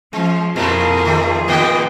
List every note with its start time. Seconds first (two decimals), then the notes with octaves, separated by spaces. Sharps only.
0.13 F3 G#3 C#4
0.56 F2 A#2 G#3 E4 F4 G#4 A#4 B5
1.06 D#3 A3
1.48 A2 D#3 B3 D#5 G5